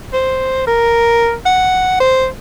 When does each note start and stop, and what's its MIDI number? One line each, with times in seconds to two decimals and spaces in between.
0.13 0.64 72
0.67 1.35 70
1.46 1.96 78
2.00 2.27 72